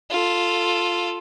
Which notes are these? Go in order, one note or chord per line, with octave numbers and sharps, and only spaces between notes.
F4 A4